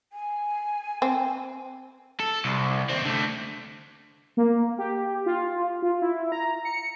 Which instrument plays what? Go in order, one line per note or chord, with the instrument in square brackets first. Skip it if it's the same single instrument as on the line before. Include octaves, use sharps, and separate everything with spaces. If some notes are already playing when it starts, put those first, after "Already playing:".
[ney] G#5
[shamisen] C4
[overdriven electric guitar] A4
C2
D#2 C4
D3 A3
[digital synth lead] A#3
G4
F4
F4
E4
A#5
C#7